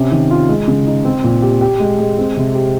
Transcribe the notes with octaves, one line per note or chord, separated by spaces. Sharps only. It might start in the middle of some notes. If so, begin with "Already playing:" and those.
Already playing: C3 C#4
D#3
F4
G#3
C#3
D#4
C4
A#2
G4
G4
G#3
G#3
C4
C3
G4